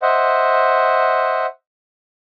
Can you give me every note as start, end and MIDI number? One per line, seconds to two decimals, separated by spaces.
0.02 1.46 72
0.02 1.46 75
0.02 1.46 76
0.02 1.46 78